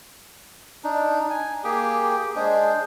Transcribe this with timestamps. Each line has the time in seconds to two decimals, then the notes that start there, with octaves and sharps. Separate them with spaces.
0.84 D4 D#4
1.30 G#5
1.64 A#3 G4 G#4 G5
2.36 G#3 D4 G#4 C5